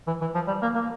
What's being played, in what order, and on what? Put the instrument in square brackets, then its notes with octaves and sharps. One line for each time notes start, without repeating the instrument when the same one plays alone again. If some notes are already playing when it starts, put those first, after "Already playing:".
[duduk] E3
E3
F3
G3
A#3
A#3